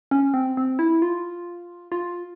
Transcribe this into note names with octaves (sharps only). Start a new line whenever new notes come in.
C#4
C4
C4
E4
F4
F4